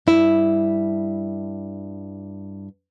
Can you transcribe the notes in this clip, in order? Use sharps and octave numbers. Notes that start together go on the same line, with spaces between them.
G2 E4 E5